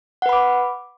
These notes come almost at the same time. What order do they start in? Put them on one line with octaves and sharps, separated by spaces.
F#5 B4 B5 D6